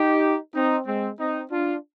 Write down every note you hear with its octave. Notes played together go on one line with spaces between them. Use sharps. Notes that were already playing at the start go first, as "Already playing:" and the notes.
Already playing: D#4 G4
C4 D#4
G#3 C4
C4 D#4
D4 F4